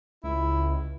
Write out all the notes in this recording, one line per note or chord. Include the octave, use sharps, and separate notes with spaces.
C#2 E4